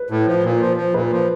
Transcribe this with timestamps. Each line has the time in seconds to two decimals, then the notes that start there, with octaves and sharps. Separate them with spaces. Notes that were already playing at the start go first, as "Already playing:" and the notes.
Already playing: B4
0.10 A2
0.27 F3
0.44 A#2
0.60 F3
0.77 F3
0.94 A#2 B4
1.11 F3